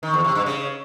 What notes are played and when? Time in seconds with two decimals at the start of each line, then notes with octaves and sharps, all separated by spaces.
0.03 D#3
0.14 E2
0.24 C3
0.35 G2
0.46 C#3